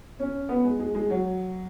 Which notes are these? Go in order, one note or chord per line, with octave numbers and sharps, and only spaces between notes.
C#4
B3
G#3
G#3
G#3
F#3